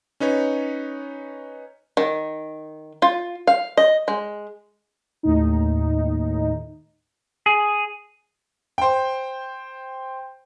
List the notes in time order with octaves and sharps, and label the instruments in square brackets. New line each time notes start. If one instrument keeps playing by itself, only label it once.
[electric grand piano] C#4 D#4 B4 C#5
[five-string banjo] D#3
F4
F5
D#5
G#3
[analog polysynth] D#2 A2 D#4
[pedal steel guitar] G#4
[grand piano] C5 G5